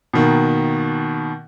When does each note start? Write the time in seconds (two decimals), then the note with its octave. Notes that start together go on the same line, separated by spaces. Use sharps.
0.13 B2 D#3 A#3